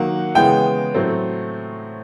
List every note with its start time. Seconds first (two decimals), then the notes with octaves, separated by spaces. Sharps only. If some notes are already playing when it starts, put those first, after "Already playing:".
Already playing: D#3 F#3 A#3 F#5
0.35 C#3 E3 G#3 B3 G5
0.94 A2 F#3 A3 C4